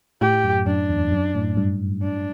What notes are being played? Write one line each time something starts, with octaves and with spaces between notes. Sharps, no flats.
A2 G4
F#2
F#2 D4
E2
F#2
A2
G2
D4